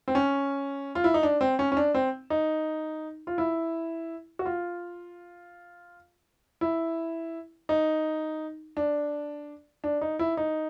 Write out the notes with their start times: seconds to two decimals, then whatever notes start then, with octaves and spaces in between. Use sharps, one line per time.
0.08 C4
0.15 C#4
0.95 F4
1.04 E4
1.14 D#4
1.23 D4
1.41 C4
1.59 C#4
1.72 C#4
1.77 D4
1.94 C4
2.30 D#4
3.27 F4
3.38 E4
4.39 F#4
4.45 F4
6.61 E4
7.69 D#4
8.77 D4
9.84 D4
10.01 D#4
10.19 E4
10.37 D#4